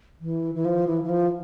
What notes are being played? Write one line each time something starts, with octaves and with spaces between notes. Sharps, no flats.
E3
E3
F3
E3
E3
F3